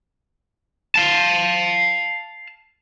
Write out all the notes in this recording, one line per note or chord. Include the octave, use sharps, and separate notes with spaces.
F5 A5